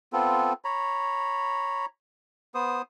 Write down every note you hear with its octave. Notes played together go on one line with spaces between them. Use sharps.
B3 C4 F4 A4
C#5 A#5 B5
B3 C5 D#6